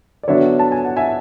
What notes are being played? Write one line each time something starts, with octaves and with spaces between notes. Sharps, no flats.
D5
D3 F#3 B3 D4 C#5 E5
A5
G#5
F#5
E5 G#5